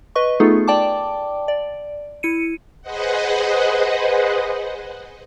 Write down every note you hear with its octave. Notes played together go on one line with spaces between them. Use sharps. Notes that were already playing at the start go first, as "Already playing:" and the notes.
B4 D#5 C#6
A3 B3 D#4 F4 G#4 A4
D5 G5 A5 D6
D5
E4 C#7 D#7
G#4 B4 C5 D#5 F#5